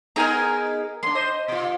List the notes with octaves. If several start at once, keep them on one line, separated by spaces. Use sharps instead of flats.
B3 D#4 G#4 A#4 G#5 A#5
A#3 D4 C6
C5 D#5
B2 F4